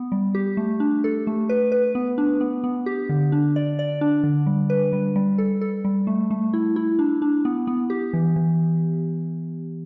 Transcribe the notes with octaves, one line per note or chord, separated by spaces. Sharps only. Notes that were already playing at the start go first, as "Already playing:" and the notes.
Already playing: B3
G3
G4
A3
D4
A4
A3
B4
B4
B3
D4
B3
B3
G4
D3
D4
D5
D5
D4
D3
G3
B4
G3
G3
A4
A4
G3
A3
A3
E4
E4
D4
D4
B3
B3
G4
E3
E3